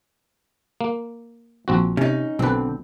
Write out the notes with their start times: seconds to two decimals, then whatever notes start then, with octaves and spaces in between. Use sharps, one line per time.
0.81 A#3
1.68 A#1 C4 F#4
1.97 C3 C#4 D#4
2.39 B1 D3 C4 B4